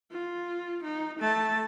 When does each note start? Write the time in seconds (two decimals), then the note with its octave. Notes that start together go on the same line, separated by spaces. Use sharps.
0.12 F4
0.84 D#4
1.19 A3 A5